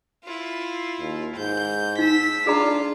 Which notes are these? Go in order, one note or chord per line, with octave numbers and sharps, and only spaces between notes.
E4 F4
D#2
G#2 G6
D#4 E6 B6
D4 F4 G#4 D5 A#5